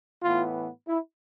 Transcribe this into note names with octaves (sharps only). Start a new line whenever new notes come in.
A2 E3 B3 F4
E4